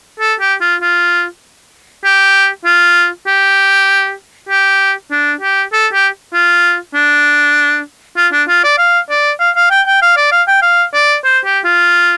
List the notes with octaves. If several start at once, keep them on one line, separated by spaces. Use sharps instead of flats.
A4
G4
F4
F4
G4
F4
G4
G4
D4
G4
A4
G4
F4
D4
F4
D4
F4
D5
F5
D5
F5
F5
G5
G5
F5
D5
F5
G5
F5
D5
C5
G4
F4